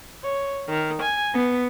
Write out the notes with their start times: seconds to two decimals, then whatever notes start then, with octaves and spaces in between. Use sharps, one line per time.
0.24 C#5
0.67 D#3
1.01 G#5
1.34 B3